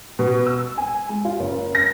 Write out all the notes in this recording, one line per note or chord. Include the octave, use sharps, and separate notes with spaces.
B2
E6
G#5
G#3
F4
F#1
A#6